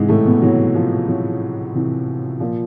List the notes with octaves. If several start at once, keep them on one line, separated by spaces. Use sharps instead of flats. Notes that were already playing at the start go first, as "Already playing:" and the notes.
Already playing: G#2 C3 E3 G#3
A2 A3
B2 B3
C3 E3 F#3
F3
C3 E3 F#3
C3 E3
A#2 F3